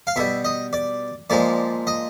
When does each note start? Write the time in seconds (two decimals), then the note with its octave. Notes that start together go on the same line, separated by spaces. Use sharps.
0.07 F5
0.16 B2 G3 E5
0.45 D#5
0.73 D5
1.30 A#2 F3 G#3 D5
1.87 D#5